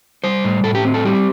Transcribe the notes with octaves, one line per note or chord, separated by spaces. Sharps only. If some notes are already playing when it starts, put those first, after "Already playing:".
G3 C5
A2
A2 A4
G4
C4
A4
G3 G4